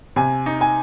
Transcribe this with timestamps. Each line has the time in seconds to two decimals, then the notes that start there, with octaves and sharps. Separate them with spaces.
0.16 C3 G#5
0.46 D#4
0.61 G#5